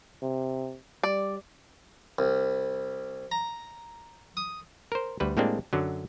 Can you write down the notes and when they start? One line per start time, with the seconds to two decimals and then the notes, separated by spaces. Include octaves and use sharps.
0.23 C3
1.03 G3 D5
2.19 C2
3.32 A#5
4.37 D#6
4.92 A#4 C5
5.20 D2 G3 B4
5.37 A2 G3 G#3 A#3 C4 D4
5.73 F#2 D3 F#3